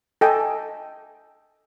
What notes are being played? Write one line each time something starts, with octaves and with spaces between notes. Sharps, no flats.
A4 D#5 G5 G#5